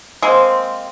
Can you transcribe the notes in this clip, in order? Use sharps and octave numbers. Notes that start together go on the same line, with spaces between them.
G#3 A#3 C4